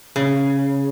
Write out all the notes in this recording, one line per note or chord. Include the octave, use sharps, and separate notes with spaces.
C#3